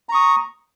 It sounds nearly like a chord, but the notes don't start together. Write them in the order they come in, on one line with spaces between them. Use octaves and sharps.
A#5 C#6 D#6